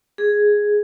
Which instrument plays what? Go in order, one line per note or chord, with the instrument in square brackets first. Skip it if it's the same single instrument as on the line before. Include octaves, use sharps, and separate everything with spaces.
[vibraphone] G#4